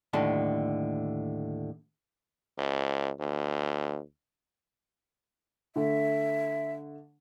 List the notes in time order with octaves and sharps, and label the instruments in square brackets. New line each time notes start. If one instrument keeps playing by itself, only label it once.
[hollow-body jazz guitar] D#2 A2 D3 A5
[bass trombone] C#2
D2
[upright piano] D3 A3 [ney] E5